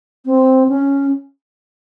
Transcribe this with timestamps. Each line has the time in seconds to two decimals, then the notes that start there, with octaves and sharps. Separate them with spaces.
0.26 C4
0.69 C#4